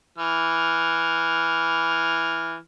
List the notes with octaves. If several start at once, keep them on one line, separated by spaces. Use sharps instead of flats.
E3 F6